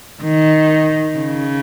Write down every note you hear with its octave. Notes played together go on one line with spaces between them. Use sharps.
D#3
C#3